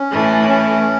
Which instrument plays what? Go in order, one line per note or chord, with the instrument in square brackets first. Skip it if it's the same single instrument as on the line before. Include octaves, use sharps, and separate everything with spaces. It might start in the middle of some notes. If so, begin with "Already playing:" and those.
Already playing: [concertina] C#4
[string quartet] A2 E3 A3
[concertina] C#4